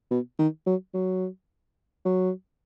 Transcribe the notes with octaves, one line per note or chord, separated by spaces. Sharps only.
B2
D#3
F#3
F#3
F#3